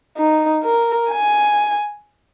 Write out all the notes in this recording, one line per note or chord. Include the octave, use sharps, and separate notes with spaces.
D#4
A#4
G#5